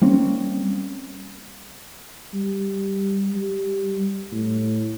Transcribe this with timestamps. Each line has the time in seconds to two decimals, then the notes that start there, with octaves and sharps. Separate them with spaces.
0.02 G3 A#3 C4 C#4
2.34 G3
3.32 G3
4.32 A2